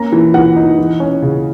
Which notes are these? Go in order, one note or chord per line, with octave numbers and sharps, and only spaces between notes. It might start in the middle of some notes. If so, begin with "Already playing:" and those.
Already playing: A#3 C#4 A#5
E3
E3 F#5
D#4
E3
C#4
C#3